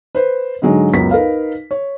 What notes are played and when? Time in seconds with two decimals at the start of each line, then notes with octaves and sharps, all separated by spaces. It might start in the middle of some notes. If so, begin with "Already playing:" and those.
0.15 B4 C5
0.62 G#2 D3 F#3 G#3
0.93 C#2 F#2 B3 B6
1.11 D#4 A#4 B4 F5
1.71 C#5